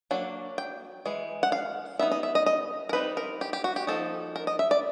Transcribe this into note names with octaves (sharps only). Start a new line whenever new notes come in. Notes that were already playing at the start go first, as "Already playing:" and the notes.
F#3 A#3 D4
G5
E3 G#3
F#5
F5
G3 B3 D#4 E5
D#5
E5
D#5
D#5
A#4
G3 C4 D#4 B4
A#4
G4
G4
F#4
G4
F3 A#3 D#4 A4
A#4
D#5
E5
D5